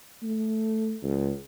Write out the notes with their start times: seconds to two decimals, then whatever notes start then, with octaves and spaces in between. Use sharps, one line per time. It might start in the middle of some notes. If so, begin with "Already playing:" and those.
0.23 A3
1.03 C#2